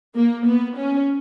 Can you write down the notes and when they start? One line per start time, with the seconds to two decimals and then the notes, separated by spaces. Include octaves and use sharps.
0.15 A#3
0.46 B3
0.77 C#4